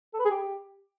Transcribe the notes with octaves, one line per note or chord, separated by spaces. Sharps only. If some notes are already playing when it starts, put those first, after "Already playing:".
A4
B4
G#4
G4